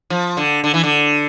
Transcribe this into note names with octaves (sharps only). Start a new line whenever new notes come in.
F3
D3
D3
E3
D3